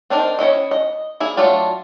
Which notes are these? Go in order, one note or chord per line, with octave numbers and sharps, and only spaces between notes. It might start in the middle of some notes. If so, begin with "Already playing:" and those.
C4 D4 D#4 A#4
C#4 D4 E4 D#5
D#5
A#3 E4 G#4
F#3 A3 D4 F4